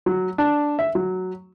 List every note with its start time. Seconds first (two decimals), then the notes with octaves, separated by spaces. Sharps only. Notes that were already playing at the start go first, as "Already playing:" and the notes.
0.06 F#3
0.38 D4
0.79 E5
0.95 F#3